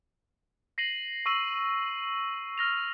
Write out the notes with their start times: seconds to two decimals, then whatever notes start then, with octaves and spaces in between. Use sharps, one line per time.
0.78 A#6 C7 D#7 F#7
1.26 C#6 E6 D#7 F#7
2.58 F6 A#6 F7